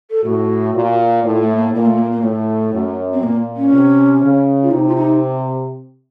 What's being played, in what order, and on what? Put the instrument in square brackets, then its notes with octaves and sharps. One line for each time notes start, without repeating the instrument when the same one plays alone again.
[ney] A4
[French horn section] A2 [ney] F#4
[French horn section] A#2
[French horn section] A2 [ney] F4
[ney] A3
A#3
[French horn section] A#2 [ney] A#3
[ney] A3
A#3
A#3
[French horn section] A2 [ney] A3
[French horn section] F#2
[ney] C4
[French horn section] A#2 [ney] A#3
[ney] C#4
[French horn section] C3
C#3
[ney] F4
[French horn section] C3 [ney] D#4
[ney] F4
D#4